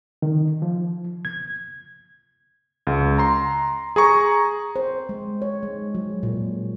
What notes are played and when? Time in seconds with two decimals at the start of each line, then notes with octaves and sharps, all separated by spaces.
0.22 D#3
0.62 F3
1.25 G#6
2.87 C#2
3.18 A#5 C6
3.96 G#4 A#5 C#6
4.76 C5
5.09 G#3
5.42 C#5
5.63 G#3
5.95 F#3
6.23 A#2